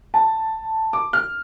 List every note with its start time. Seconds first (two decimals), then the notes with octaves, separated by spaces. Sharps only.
0.14 A5
0.93 D6
1.13 F6